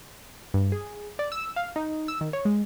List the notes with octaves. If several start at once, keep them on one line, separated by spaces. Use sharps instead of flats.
G2
G#4
D5
E6
F5
D#4
E6
D#3
C#5
G#3